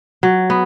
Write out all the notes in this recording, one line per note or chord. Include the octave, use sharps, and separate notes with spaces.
F#3
B3